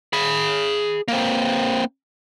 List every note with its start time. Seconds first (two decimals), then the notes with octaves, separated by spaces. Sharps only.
0.13 G#4 B5
1.08 A#3 C4